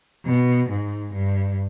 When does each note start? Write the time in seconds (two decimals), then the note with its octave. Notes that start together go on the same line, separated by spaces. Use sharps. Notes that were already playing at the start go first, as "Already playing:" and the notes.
0.25 B2
0.70 G#2
1.13 G2